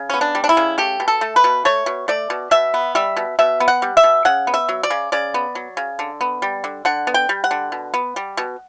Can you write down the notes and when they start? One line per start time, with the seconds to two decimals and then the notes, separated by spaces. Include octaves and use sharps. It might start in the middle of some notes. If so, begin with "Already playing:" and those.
Already playing: C#3
0.10 B3 C#4
0.21 D4
0.35 G3
0.44 D4
0.49 E4
0.57 C#3
0.78 A3 G4
1.00 B2
1.08 A4
1.21 A3
1.36 B4
1.44 B2
1.65 A3 C#5
1.86 B2
2.08 A3 D5
2.30 B2
2.51 B2 E5
2.74 B3
2.95 G3 E5
3.17 B2
3.39 B2 E5
3.60 B3
3.68 F#5
3.82 G3
3.97 E5
4.03 B2
4.25 C#3 F#5
4.47 B3
4.54 E5
4.69 F#3
4.83 D5
4.90 C#3
5.12 C#3 D5
5.34 B3
5.55 F#3
5.77 C#3
5.99 D3
6.21 B3
6.42 G3
6.64 D3
6.85 D3 F#5
7.07 B3
7.14 G5
7.29 G3
7.44 F#5
7.51 D3
7.72 B2
7.94 B3
8.16 G3
8.37 B2